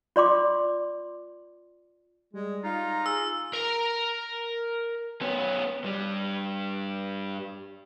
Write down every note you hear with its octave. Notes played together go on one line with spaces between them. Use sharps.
F4 D5 C6 D6
G3 G#3
D#4 F4
A#5
G#4 E6
A#4 A#5
B3 C#4
G2 G3